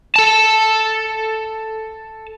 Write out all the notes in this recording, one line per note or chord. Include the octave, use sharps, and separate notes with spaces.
A4 A5